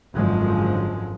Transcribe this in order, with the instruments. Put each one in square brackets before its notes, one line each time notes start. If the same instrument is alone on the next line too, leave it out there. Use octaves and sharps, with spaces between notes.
[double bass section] G#1 F#2 D3 F3 G#3